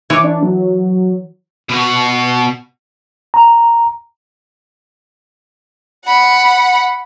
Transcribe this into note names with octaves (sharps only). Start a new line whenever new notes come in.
E3 C#5 D6
D4
F#3
B2 F#4
A#5
F#5 B5